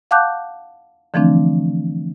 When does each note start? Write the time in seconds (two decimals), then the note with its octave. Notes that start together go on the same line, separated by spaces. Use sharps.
0.11 F5 F#5 A5 D6 F#6 G6
1.14 D3 E3 F3 A3 C4 D4